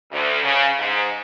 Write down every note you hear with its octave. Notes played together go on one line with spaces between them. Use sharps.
D2
C#3
G#2